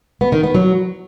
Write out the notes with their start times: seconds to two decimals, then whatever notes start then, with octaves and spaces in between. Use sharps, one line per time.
0.21 B3
0.32 D#3
0.43 B3
0.55 F#3